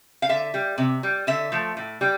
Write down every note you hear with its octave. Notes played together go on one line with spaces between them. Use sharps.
F5
D3 E5
G3
C3
G3
D3 E5
F3 A3
A2
G3